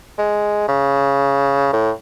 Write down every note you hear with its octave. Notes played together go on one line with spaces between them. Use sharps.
G#3
C#3
A2